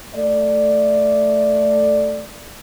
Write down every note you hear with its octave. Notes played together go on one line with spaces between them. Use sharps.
A3 D5